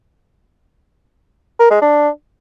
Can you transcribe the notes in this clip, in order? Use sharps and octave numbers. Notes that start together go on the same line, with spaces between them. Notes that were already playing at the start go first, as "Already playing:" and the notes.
A#4
G#3
D4